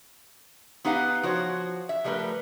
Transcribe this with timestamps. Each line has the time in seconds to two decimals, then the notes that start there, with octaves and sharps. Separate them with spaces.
0.84 B3 D#4 G4 B4 F5 F#5
1.23 F3 F#4 C5 C#5
1.89 E5
2.04 F3 G3 A3 A#4 B4